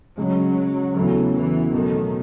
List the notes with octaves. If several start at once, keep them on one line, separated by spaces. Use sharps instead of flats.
C#3 F#3 G#3 C#4
E2 C#3 E3 F#3 A3
E3
B2 D#3 F#3 A3